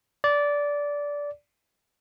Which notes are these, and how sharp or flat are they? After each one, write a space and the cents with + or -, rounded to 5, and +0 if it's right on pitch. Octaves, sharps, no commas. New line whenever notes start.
D5 -15